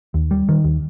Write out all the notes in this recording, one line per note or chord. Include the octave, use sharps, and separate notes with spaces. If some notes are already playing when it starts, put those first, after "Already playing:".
D#2
G3
D#3
D#2